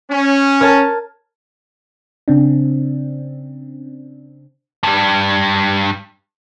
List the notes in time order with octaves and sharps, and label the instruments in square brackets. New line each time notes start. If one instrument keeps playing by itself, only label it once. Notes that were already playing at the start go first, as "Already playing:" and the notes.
[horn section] C#4
[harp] A#4 C#5 A5
[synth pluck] C#3 C4 D4
[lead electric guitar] G2 G3